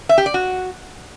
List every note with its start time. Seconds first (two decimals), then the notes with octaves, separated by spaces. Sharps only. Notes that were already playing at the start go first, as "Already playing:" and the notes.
0.09 E5
0.18 G4
0.26 D5
0.34 F#4